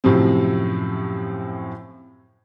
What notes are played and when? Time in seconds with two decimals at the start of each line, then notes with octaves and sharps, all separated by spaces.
0.04 F#2 A2 C3 F3 C4